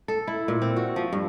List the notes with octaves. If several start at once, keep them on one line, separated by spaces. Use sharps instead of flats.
A4
E4
A#2
C4
F#4
F3
G2